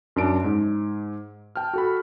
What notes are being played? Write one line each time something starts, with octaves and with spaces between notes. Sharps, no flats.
F#2 D4 D7
G#2
G5 A5 F6
F#4 A4 B5